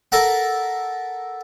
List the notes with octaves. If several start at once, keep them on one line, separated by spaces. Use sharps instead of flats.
A4 A#4 E5 F#5